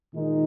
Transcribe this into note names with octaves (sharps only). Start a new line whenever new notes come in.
A#2 D#3 G#3 D#4